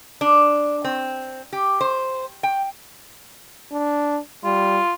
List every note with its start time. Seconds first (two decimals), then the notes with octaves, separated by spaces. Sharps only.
0.21 D4
0.84 C4
1.53 G4
1.81 C5
2.43 G5
3.72 D4
4.44 G3 F4